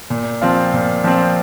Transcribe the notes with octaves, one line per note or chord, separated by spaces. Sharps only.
A#2
F3 C4 F4
A#2
F3 C4 F4